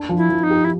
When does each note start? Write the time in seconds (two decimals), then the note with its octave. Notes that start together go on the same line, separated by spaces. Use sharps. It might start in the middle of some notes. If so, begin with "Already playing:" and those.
Already playing: D4
0.09 F3
0.17 E4
0.30 F3
0.43 D#4
0.50 G4
0.64 E4